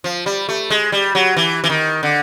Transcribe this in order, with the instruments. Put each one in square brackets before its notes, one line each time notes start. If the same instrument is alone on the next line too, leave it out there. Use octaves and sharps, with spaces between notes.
[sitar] F3
G3
A3
G#3
G3
F#3
E3
E3
D#3
D3